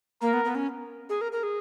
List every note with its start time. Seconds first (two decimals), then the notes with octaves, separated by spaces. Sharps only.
0.22 A#3 A#4
0.33 B3
0.45 B3
0.55 C#4
1.09 G#4
1.21 A#4
1.32 A#4
1.43 G#4